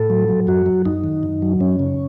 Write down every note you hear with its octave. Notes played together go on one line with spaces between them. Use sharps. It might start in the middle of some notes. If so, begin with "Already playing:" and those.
Already playing: A2 A4
F#3
F#3
F#2 F#4
F#3
F#2 D#4
D#3
F#2
F#3
F#2 C#4
C#3